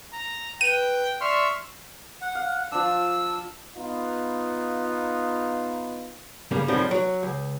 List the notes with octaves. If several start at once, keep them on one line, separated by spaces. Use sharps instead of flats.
A#5
B4 G5 D#7
D5 E5 C6 C#6 F6
F#5
F5
F3 D4 E6
B3 D#4 F4
G2 C#3 G3 A#3
F#2 A2 D#3 F3 G3 C4
F#3
C#2